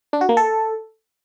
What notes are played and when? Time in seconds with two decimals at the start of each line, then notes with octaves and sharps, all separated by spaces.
0.13 D4
0.21 F#4
0.29 A#3
0.37 A4